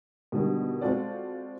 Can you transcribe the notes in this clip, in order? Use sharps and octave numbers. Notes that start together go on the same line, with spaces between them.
B2 D3 D#3 G3
G#3 C4 F4 F#4 A4 D5